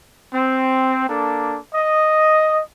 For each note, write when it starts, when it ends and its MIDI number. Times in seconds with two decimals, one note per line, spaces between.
0.32 1.02 60
1.08 1.57 58
1.08 1.57 62
1.08 1.57 69
1.74 2.61 75